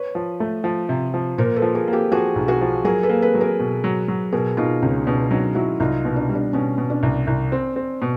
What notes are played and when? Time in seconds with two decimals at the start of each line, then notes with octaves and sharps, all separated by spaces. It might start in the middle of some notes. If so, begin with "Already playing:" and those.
Already playing: B4 C#5
0.15 F3
0.40 A3
0.64 F3
0.89 C3
1.14 F3
1.38 A#2 A#4 C5
1.56 A4 B4
1.62 F3
1.74 G#4 A#4
1.88 A#3
1.93 G4 A4
2.12 F3 F#4 G#4
2.36 B1
2.48 F#4 G#4
2.61 F3
2.85 F#3 G#4 A#4
3.03 A4 B4
3.09 A#3
3.22 A4 B4
3.35 F#3
3.41 G#4 A#4
3.60 B2
3.84 F#3
4.08 F#3
4.32 B2 G#4 A#4
4.57 B2 D#4 F4
4.82 C#2 C#4 D#4
5.07 B2 D4
5.31 F#3 C#4 D#4
5.55 F#3 E4 F#4
5.80 C2 D#4 F4
6.05 B2
6.16 D4
6.29 G3
6.35 D4
6.53 B2 C#4
6.78 B2
6.90 D4
7.03 C2
7.27 C2
7.52 C4
7.76 C4
8.02 B2